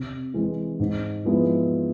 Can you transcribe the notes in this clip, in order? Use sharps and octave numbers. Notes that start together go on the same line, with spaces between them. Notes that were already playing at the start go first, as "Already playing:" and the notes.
Already playing: C3
E3 G#3 C4
G#2
F3 G#3 B3 E4